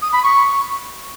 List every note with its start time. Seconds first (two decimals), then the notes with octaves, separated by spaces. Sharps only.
0.02 D#6
0.13 B5
0.23 C#6